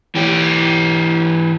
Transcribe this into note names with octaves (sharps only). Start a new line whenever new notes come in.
E3 G4